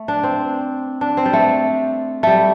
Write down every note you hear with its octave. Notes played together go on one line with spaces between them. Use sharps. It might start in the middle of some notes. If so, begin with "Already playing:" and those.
Already playing: A3
D4
C4
D4
C4
G3
A3
G3 A3